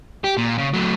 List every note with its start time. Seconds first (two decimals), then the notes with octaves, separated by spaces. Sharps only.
0.24 G4
0.37 A#2
0.58 C#3
0.74 F#3 A3